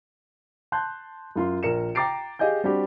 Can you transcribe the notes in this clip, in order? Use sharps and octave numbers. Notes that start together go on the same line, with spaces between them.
A5 C6 F#6 G6
F#2 F4 C6
A#1 A#4 C#7 E7
G5 A#5 D6 A6 C7 D7
G4 G#4 D#5 F5 G#5 G6
G3 C4 D4 F#4 G4